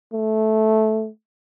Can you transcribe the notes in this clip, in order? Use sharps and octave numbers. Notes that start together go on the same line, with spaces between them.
A3